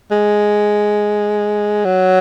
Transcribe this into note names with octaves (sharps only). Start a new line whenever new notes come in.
G#3
F#3